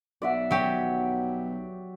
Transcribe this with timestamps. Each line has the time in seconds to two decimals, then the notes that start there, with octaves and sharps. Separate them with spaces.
0.22 B1 D5 E5 F#5
0.51 F#3 G4